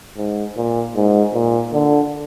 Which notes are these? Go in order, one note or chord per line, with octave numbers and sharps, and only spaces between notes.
G#2
A#2
G#2
A#2
D3